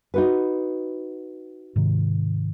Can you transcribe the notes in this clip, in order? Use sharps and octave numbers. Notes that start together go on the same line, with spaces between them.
D#4 F#4 B4
G#2 C3 D#3